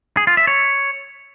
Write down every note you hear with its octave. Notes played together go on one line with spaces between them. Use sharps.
G#4
F4
E5
C#5